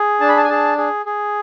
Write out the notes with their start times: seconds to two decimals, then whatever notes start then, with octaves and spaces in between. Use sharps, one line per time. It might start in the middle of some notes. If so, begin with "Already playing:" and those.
Already playing: G#4
0.21 D4 A5
0.29 B5
0.37 A5
0.44 G#5
0.49 G#4 A5
0.78 G#4
1.06 G#4